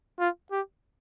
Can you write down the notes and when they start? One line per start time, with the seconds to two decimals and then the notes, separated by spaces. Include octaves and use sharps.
0.19 F4
0.52 G4